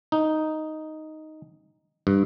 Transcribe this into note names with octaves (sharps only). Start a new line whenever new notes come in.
D#4
G2